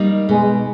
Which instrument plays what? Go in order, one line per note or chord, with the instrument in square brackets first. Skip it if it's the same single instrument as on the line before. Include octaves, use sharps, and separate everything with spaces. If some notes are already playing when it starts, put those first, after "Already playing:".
Already playing: [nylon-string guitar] G3 A#3 D#4
[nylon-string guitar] B2 [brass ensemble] G#3